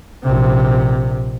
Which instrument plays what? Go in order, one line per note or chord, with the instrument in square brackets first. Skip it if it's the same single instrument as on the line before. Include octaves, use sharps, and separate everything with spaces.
[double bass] A#1 C3